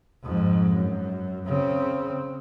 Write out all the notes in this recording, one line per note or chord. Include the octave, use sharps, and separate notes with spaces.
F2 G#2
F#2
C#3 C4